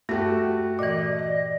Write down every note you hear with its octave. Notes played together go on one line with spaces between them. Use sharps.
G2 A3 F#4 G4
A#2 E3 D5 D#5